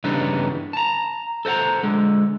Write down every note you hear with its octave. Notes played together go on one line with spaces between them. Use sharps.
G2 C#3 E3 B3 D4 D#4
A5 A#5
A4 C5 D#5 F#5 A#5
D3 G#3